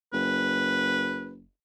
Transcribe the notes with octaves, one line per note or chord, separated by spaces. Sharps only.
F#1 B4